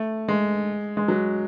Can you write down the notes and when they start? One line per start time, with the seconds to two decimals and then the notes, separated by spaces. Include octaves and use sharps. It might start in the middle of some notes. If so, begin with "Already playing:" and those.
Already playing: A3
0.29 G#3
0.97 G#3
1.08 F#3